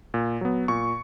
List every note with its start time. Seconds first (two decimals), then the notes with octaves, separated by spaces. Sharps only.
0.14 A#2
0.41 F#3 B3
0.68 A#2 C#6